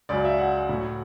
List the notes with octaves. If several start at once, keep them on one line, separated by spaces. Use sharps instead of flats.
C#2 C#3 F#3 D5
E5
F#5
A2 F#3